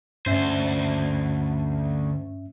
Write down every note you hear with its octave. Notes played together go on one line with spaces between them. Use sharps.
D2 G2 C#4 C5 E5